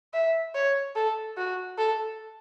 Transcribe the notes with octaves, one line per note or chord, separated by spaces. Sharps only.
E5
C#5
A4
F#4
A4